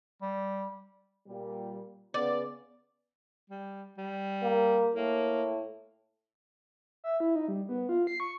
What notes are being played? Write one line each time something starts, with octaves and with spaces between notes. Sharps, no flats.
G3
A#2 G3
C#3 B3 D5
G3
G3
A#3
A2 A#3
E5
E4
D#4
G3
B3
F4
C7
C#6